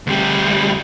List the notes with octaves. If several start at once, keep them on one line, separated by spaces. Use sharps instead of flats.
D2 G3